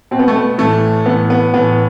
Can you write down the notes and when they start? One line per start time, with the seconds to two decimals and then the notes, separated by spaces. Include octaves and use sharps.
0.11 B2 C4
0.19 B3
0.28 A3
0.36 B3
0.58 A2 E3 A3
1.05 A2 E3 B3
1.30 B3
1.54 A2 E3 B3